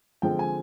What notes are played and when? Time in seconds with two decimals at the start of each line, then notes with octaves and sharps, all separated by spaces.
0.22 D3 F3 G#3 C4 G5
0.39 G#5